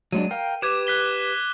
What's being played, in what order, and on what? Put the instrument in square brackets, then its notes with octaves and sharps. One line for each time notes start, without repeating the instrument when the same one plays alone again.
[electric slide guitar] F#3 G#3 D4 [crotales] D#7
[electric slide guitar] A#4 F5 G5
[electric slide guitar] G4 B4 [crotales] D6 G#6 E7
[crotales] F#6 B6 G7